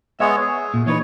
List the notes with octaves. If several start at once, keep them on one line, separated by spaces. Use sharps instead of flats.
G#3 B3 C#5 E5
G#4
A#2
E3 D#4 B4 C#5